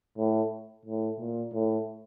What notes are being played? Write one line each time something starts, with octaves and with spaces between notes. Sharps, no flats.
A2
A2
A#2
A2